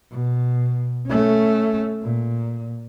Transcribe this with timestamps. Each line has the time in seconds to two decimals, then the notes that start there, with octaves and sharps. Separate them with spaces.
0.11 B2
1.07 A3 C#4
2.03 A#2